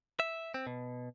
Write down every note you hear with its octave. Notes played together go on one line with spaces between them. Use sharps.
E5
C4
B2